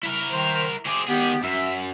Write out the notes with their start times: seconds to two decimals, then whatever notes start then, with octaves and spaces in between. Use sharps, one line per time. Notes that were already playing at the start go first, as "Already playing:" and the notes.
0.03 E4 A#4
0.32 D#3 C5
0.86 C4 G#4 D6
1.08 D#3 B3 G4 G#4
1.43 F#2 E5